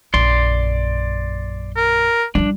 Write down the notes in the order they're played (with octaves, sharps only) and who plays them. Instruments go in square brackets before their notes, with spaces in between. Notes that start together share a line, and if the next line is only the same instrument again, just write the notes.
[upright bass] A#1 F#2 [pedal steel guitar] D5 C6
[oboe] A#4
[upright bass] G3 E4 [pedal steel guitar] D4